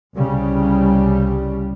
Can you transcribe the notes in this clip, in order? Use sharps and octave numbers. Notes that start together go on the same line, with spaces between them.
C2 C#3 G3